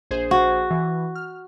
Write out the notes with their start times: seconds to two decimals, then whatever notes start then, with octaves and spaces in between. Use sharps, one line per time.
0.11 A#1 G#4 C5
0.31 F#4
0.71 E3
1.15 F6